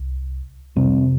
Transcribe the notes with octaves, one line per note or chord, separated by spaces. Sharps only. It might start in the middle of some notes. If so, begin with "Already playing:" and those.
Already playing: C2
F2 C3 G3 C4